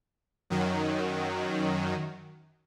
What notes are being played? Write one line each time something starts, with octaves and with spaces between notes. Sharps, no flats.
F#2 D#3 F#3